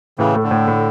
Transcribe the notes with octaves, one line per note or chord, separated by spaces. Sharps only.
A2 C#3 E3
A3
D3
A2
A2